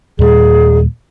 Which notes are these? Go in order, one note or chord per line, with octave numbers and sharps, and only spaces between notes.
D#2 A#2 G3 G#4